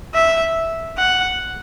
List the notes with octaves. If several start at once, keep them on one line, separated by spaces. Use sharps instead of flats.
E5
F#5